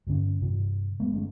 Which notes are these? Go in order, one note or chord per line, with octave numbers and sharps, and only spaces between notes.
G2 D3 C#4
G2 C3
G#3 A3 B3
G1 G#3 A3 C#4